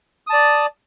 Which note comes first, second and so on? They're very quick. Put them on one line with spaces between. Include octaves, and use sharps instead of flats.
D#6 A5 D5